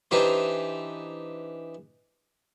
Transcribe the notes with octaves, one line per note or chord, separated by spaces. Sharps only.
E3 D4 D#4 G4 C5